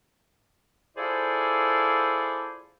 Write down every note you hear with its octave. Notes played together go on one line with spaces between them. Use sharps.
E4 F4 G#4 A4 C5 D5